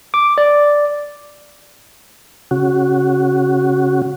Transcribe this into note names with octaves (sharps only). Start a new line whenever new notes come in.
D6
D5
C#3 F#4